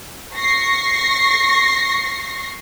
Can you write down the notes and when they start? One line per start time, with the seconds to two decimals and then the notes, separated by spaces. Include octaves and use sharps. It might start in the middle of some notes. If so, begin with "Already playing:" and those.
0.36 C#6 A#6 C7